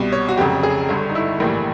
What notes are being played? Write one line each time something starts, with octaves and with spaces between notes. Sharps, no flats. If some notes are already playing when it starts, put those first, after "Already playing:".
Already playing: C2 B2 G3
C#5
F#4
F1 F2 C#3 F#3 G4
G#4
G1 G2 D3
D#4
E4
A#1 A2 E3 G3 A#3